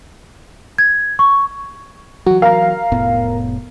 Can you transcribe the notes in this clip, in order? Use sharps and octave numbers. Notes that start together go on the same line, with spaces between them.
G#6
C#6
E3 F#3 F#4
A#4 F5 A#5
F1 A2 B3